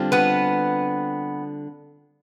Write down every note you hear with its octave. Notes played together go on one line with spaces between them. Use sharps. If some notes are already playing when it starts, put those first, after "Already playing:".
Already playing: D3 G3 C4 F4
B3 B4